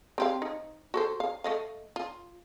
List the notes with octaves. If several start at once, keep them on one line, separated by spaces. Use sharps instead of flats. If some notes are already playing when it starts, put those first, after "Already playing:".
C4 G4 F5
D#4
F#4 A4 C5
F5
A3 D#5 F5
F4